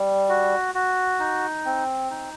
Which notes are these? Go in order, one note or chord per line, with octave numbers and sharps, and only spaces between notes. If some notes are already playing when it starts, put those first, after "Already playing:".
Already playing: G3
F#4
F#4
D#4
C4
D#4